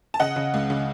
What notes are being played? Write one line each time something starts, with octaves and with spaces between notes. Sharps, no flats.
A5
C#3 D#5 F#5
C#3
C#2
C#3